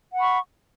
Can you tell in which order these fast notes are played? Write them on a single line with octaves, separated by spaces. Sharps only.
F#5 B5 C#6